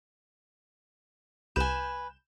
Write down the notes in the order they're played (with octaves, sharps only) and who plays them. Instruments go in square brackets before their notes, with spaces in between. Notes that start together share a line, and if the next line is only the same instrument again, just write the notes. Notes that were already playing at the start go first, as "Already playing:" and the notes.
[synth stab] C2 G6 E7 [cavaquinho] B4 G#5